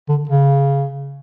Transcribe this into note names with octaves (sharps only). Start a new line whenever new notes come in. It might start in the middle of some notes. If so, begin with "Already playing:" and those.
D3
C#3